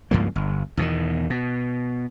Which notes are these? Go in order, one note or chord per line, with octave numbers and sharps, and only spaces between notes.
C#2 G2 F3 A#3
G1
E2 B2 D3 D#3
B2